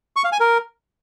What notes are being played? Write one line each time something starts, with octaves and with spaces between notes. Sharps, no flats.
C#6
F5
G#5
A#4